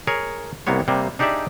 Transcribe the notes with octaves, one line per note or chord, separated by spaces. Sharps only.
G#4 A#4 C#5
C2 C3 A#3 B3 C#5
C3 G3 A#3
D4 D#4 G4 G#4 D5 E5